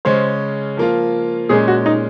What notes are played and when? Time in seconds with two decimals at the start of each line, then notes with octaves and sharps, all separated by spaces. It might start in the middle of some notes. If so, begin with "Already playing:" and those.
0.05 C#3 G#3 C#4 C5
0.77 F3 A#3 F4
1.49 A#2 G#3 C#4 G#4
1.68 F#4
1.86 D#4